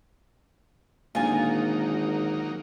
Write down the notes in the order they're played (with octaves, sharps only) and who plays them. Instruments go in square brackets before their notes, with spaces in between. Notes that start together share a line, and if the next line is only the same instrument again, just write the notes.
[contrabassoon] G#1 [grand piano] A#2 D3 [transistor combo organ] F#3 A#3 D#4 [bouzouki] F4 G#5